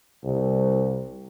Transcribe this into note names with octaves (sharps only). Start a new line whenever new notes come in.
C2